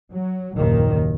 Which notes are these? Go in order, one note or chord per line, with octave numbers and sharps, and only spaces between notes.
F#3
F#1 D#2 A#2 D#3